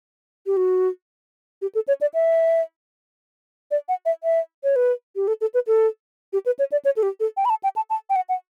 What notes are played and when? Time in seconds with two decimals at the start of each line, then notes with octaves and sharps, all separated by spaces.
0.46 G4
0.57 F#4
1.62 G4
1.75 A4
1.88 C#5
2.01 D5
2.14 E5
3.71 D5
3.89 F#5
4.06 E5
4.24 E5
4.64 C#5
4.76 B4
5.16 G4
5.28 A4
5.41 A4
5.54 B4
5.67 A4
6.33 G4
6.46 B4
6.59 C#5
6.72 D5
6.85 C#5
6.97 A4
7.03 G4
7.20 A4
7.37 G5
7.45 B5
7.50 A5
7.64 G5
7.76 A5
7.90 A5
8.10 G5
8.16 F#5
8.29 F#5